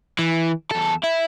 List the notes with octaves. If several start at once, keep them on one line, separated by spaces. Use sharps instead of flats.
E3
E2 A4
E4